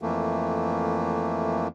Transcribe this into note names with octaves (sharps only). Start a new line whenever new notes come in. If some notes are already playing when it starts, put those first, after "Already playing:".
F2 E3 A3 A#3